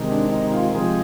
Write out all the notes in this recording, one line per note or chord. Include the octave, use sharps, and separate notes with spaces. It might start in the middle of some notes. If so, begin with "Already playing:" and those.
Already playing: C3 D#3 G#3
D4
D#4
F4
C3 F3 G#3 G#4